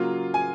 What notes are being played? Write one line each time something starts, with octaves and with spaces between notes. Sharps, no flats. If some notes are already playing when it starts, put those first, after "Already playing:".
Already playing: C#3 F#3 A#3 F4
G#5